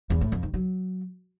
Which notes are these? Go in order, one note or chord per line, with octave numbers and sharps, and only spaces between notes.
E2
A2
F2
D#3
F#3